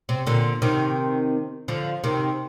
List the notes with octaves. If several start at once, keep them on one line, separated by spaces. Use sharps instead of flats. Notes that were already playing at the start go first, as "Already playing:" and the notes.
C3
A#2 D3
C3 D#3
D3 F3
C3 D#3